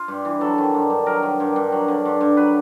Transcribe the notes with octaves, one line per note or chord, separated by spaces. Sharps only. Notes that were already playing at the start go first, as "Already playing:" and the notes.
Already playing: F4
G2
E3
F#3 A4
D#3
G2
G2
F#3 A#4
D#3
G2
G2
F#3
D3
G2
G2
F#3 B4